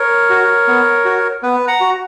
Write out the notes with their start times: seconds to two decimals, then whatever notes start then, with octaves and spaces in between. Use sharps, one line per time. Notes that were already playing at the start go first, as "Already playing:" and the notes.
Already playing: A#4 C#5
0.30 F#4
0.68 B3
1.05 F#4
1.43 B3 B4
1.67 F#5 A#5
1.80 F#4